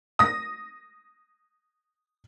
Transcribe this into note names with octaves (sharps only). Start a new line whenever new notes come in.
D#6 A#6